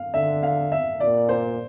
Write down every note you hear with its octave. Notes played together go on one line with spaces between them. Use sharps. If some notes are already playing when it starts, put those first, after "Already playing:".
Already playing: F5
D3 E5
F5
E5
A#2 D5
C5